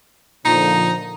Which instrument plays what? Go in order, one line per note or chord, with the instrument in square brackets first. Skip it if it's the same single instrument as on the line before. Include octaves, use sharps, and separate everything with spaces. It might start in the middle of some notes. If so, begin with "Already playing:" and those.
[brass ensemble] A#2 D3 F3 [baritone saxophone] D#4